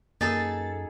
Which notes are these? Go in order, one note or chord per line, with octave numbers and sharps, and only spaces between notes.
F#2 A#3 D#4 G#4 A4 A6